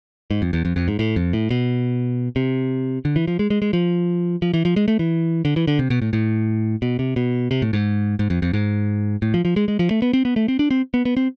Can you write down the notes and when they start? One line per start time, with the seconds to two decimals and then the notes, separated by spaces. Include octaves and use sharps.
0.31 G#2
0.42 F2
0.53 E2
0.65 F2
0.76 F2
0.88 G#2
0.99 A2
1.16 F2
1.33 A2
1.51 B2
2.36 C3
3.05 D3
3.16 E3
3.28 F3
3.39 G#3
3.50 G#3
3.62 G#3
3.73 F3
4.42 F3
4.54 E3
4.65 F3
4.76 G#3
4.88 A3
4.99 E3
5.45 D3
5.56 E3
5.67 D3
5.79 C3
5.90 B2
6.02 A2
6.13 A2
6.82 B2
6.99 C3
7.16 B2
7.51 C3
7.62 A2
7.73 G#2
8.19 G#2
8.30 F2
8.42 F2
8.53 G#2
9.22 A2
9.34 F3
9.45 F3
9.56 G#3
9.68 G#3
9.79 F3
9.91 A3
10.02 B3
10.13 C4
10.25 B3
10.36 A3
10.48 C4
10.59 D4
10.71 C4
10.94 B3
11.05 B3
11.17 C4